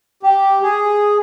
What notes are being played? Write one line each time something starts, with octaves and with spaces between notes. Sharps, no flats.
G4
G#4